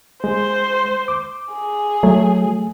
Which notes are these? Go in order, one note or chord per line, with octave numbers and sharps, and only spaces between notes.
G#3 C5
D6
G#4
F#3 A3